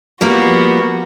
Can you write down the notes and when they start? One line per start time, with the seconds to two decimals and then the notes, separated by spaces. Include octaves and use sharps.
0.21 F3 G3 A#3 B3 F#4